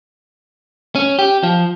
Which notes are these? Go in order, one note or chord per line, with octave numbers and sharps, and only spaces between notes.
C#4
G4
F3